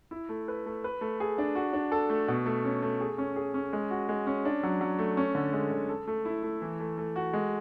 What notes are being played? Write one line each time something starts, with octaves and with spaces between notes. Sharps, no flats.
E4
A3
B4
A3
B4
A3
G#4
D4
F#4
D4
A4
A3
B2
A3
C#4
A3
G#4
C#4
G#4
C#4
G#3
F#4
G#3
C#4
D4
F#3
F#3
A3
C#4
D3
G#3
D3
A4
A3
E4
A3
E3
A3
A3
F#4
G#3